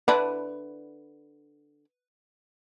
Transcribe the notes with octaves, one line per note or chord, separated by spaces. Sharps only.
D3 D4 E4 B4